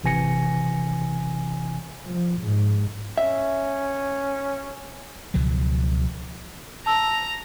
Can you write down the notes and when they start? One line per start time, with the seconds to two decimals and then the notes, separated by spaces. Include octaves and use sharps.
0.04 G#1 C3 E3 G#5 A#6 C#7
2.09 F3
2.41 G#2
3.18 C#4 E5
5.34 C#2 B2 F3 F#3
6.86 A5 A#5 E6